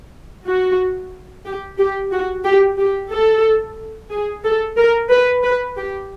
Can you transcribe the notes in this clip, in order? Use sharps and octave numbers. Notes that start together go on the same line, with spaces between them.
F#4
G4
G4
F#4
G4
G4
A4
G#4
A4
A#4
B4
B4
G4